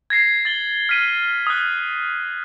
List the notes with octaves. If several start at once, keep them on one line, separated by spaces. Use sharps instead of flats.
G#6 A#6 C7
A6 F#7 G7
F6 B6 D#7
D#6 F#6